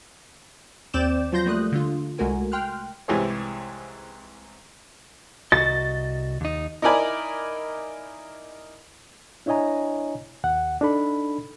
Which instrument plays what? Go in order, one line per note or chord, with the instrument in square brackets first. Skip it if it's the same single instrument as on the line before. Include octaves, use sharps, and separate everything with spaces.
[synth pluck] D#2 C4 D5 D6 G6 E7
F3 F#3 F4 C6 G6 A#6
G3 A3 A#3 D#6 F#6
D3 F4
C2 G#3 A3 F#4 A#4 G#5
G5 C6 F6 F#6
[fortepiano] C2 G#2 E3 G4 G#4 C#5
[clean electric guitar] C2 F#4 D#5 [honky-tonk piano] A6
[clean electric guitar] D#2 D#4
[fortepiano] D#4 E4 A#4 D5 G#5 B5
[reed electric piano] D4 E4 C#5 D#5 G#5 A#5
D#2 F#5
D4 D#4 A4 B5